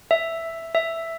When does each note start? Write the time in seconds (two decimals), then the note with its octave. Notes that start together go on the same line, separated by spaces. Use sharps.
0.11 E5
0.75 E5